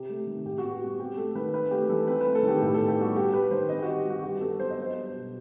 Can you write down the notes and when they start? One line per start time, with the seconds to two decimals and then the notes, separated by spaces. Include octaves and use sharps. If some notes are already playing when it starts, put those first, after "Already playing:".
Already playing: C3 C4 G4
0.09 A3
0.27 D#3
0.45 A2 G4
0.58 F#4
0.64 B3
0.72 G4
0.81 G3 F#4
0.99 C4 G4
1.17 A3 A4
1.35 D#3 B4
1.53 C4 B4
1.71 A3 G4
1.89 E3 A4
2.07 C4 B4
2.21 B4
2.26 A3
2.35 A4
2.43 D#3 G4
2.61 A2 G4
2.74 B3 A4
2.88 G4
2.98 G3 F#4
3.16 G2 G4
3.33 G3 B4
3.51 D#3 C5
3.69 C4 D#5
3.79 G4
3.83 G3 F#4
4.05 D#3
4.10 F#4
4.23 G2 G4
4.41 B3 A4
4.59 F#3 C5
4.70 D#5
4.78 B3 C5
4.95 G3
5.14 B2